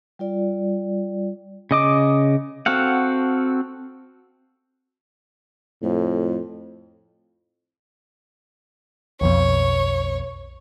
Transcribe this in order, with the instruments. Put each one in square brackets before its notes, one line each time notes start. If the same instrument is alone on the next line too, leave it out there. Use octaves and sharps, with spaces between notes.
[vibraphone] G3 F4 D5
[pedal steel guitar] C#3 D#5 D6
C4 F#4 A4 F5 F#5
[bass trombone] F2 [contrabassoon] A2
[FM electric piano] B1 F2 B2 [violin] C#5